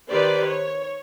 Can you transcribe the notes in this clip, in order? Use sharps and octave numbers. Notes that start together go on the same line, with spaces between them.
D#3 G4 B4 C5 D5
C#5